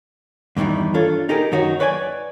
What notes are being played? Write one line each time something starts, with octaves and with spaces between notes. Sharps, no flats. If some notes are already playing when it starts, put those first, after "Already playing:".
E2 G2 C3 D#3 E3
D4 F4 A4 C#5
D#4 G4 G#4 A#4
F#2 D#3 D#4 F#4 C#5
B4 C#5 D5 G#5